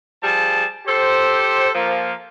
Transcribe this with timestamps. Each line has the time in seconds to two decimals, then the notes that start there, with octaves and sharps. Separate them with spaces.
0.22 F3 G3 G#4 A5
0.87 G4 A4 C5
1.75 F3 A#3